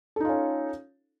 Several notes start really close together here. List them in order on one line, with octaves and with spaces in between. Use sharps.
A4 D#4 F4 C#4